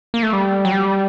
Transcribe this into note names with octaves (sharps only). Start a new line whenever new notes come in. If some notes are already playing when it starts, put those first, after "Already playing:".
A#3
A3
G3
F#3
G3